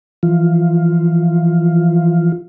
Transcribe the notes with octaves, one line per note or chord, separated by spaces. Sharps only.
E3 F3 F4